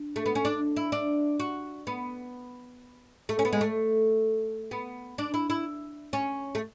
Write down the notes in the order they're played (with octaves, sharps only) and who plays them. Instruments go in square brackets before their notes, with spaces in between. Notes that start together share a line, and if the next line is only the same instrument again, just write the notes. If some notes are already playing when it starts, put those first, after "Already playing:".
Already playing: [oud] D4
A3
B3
C#4
D4
E4
D4
F#4
B3
A3
C#4
B3
G#3
A3
B3
D4
E4
E4
C#4
A3